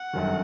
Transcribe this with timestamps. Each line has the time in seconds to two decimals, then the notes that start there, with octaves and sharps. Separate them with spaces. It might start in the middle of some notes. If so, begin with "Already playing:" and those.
Already playing: F#5
0.13 G1 F#2 D#3